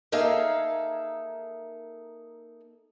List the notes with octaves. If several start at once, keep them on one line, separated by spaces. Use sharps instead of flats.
A#3 D#4 G#4 A4 E5 F5